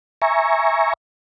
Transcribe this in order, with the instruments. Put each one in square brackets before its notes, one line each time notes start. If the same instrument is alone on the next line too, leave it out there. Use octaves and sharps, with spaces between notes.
[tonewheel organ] E5 G#5 A#5 C#6